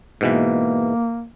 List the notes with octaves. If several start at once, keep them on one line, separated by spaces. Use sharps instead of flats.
G#2 B2 E3 A#3